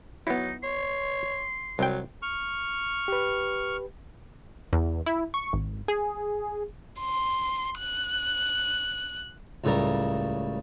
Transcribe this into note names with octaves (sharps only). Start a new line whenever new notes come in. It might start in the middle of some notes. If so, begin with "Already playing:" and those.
F#3 B3 D#4 E4
C#5 C6
C2 F#3 G5
C#6 F6
G4 B4
E2
E4
C#6
G#1
G#4
C6
F#6
C#2 A2 C#3 G3 A#4